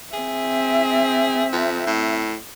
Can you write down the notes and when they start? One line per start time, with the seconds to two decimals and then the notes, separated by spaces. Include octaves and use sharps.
0.13 C4 G#4 E5
1.53 F2
1.86 A2